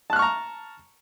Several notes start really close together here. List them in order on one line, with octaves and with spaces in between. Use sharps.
A5 F#6 F6 C#6 A#5